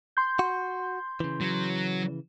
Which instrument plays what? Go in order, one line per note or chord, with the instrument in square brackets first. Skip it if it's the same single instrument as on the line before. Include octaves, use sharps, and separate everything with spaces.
[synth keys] C6 G6
[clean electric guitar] F#4
C#3 E3
[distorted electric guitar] F#3